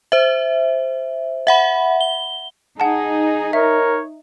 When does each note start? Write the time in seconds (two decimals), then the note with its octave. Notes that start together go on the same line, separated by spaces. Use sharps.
0.12 C5 E5
1.47 E5 F#5 B5
2.01 G7
2.80 D#4 G#4 F#5 A5
3.53 A#4 C#5 E5